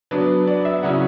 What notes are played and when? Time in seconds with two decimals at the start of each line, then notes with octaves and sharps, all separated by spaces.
0.11 F#3 B3 D4 B4
0.47 D5
0.65 E5
0.83 C#3 F#3 C#4 E4 F#5